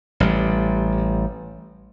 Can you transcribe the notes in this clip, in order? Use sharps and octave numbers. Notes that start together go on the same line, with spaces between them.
A1 G3